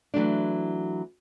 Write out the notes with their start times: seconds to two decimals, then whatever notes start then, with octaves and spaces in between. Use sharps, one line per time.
0.14 E3 F#3 A3 D4